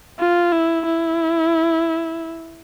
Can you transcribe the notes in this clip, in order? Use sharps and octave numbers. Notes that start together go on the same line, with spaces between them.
F4
E4
E4